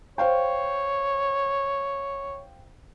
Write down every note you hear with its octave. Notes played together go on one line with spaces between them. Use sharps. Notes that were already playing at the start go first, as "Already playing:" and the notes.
C5 C#5 F5 G5